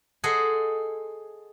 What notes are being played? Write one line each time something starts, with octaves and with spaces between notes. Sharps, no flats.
G#4 A4 C5 D#5 F#5 G#5